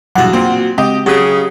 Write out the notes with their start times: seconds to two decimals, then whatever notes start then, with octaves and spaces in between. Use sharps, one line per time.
0.15 E2 G2 B2 F#3 F#4 F#5
0.33 A#2 A#3 C4
0.78 C#3 G#3 C4 G4 D#5
1.06 C#3 F#3 G4 F#5 D#6